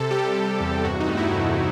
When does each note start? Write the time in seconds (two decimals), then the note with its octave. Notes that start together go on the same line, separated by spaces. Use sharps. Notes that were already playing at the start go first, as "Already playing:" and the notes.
Already playing: C3 A4
0.11 G3 G4
0.36 C3
0.60 E2
0.85 G2 F#4
1.00 D#4
1.09 A3
1.17 E4
1.34 G2